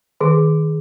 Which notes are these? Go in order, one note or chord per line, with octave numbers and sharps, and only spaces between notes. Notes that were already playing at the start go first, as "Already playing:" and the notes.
D#3 G#4